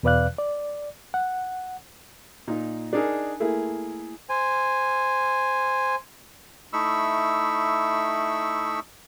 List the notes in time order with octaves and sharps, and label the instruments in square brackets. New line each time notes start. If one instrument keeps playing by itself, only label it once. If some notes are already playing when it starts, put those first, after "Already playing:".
[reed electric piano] E2 B2 B4 D5 F5 F#6
D5
F#5
[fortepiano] A#2 D#4
D4 D#4 G#4 A#4
A3 A#3 E4 G#4
[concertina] C5 G#5
A3 D#4 E4 B5 C#6 E6